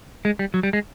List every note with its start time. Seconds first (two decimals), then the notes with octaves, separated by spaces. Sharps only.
0.25 G#3
0.39 G3
0.54 F#3
0.63 G3
0.73 G#3